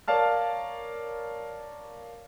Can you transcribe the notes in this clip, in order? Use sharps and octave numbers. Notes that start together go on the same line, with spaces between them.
A#4 C#5 D5 F5 A5 F6